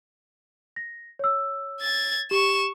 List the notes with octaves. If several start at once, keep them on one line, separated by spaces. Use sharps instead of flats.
A#6
C#5 E6
G#6 A6
G4 C#6 E7